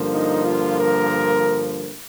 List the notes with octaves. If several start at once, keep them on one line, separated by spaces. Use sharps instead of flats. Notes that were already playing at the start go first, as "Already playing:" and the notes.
Already playing: G2 D3 F3 A#3
D#4
F4
A#4